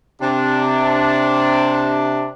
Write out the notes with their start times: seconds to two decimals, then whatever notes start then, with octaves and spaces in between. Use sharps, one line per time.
0.21 C3 D4